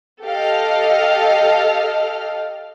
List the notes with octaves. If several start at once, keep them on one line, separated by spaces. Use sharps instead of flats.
G4 A4 D#5 F5 F6